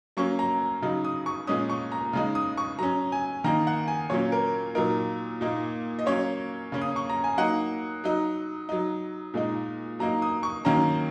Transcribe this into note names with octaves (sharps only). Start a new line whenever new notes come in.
F#3 A#3 C#4 C#6
A#5
C#3 F#3 D#4
D#6
C#6
A#2 G#3 C#4 D#6
C#6
A#5
C#3 G#3 D#4
D#6
C#6
F#3 C#4 A#5
G#5
D#3 A#3 D#4 A#5
F#5
G#5
A#2 F#3 A#3 C#4 C#5
A#4
A#2 F#3 D#4 A#4
A#2 A#3 D#4
D#5
F#3 A#3 C#4 C#5
C#3 A#3 C#4
D#6
C#6
A#5
G#5
F#3 A#3 D#4 F#5
F#3 D#4
F#3 D#4
A#2 G#3 D#4
F#3 A#3 D#4 A#5
D#6
C#6
D#3 F#3 A#3 C#4 A#5